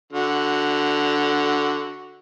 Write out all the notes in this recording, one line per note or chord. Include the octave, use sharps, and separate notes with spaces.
D3 F#4